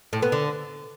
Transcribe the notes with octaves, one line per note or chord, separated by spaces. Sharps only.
A2
B3
D3